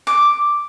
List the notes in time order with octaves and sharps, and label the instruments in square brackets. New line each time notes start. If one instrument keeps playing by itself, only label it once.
[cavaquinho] D6